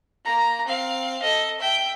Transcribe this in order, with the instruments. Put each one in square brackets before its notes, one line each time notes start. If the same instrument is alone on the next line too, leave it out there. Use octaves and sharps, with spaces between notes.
[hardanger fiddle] A#3 A#5
C4 F5
A4 D#5
E5 G5